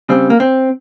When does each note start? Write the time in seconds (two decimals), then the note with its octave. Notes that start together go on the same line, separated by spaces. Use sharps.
0.09 C#3 G3 C4
0.30 A#3
0.40 C4